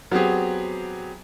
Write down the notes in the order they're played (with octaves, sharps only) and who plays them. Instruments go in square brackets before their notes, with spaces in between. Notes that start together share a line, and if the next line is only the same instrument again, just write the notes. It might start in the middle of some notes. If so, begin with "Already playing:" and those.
[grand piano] F#3 B3 C4 G4 G#4